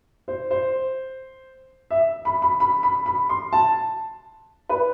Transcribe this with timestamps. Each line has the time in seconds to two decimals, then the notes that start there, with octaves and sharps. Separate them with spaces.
0.28 C5
0.51 C5
1.91 E5
2.25 B5
2.42 B5
2.60 B5
2.83 B5
3.06 B5
3.29 C6
3.53 A5
4.69 B4